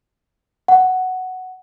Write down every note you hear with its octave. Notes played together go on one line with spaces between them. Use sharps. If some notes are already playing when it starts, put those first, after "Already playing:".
F#5